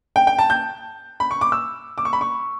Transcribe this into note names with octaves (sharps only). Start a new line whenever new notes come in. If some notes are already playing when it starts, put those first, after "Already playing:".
G5
G5
A5
G6
B5
C#6
D6
E6
D6
C#6
B5
C#6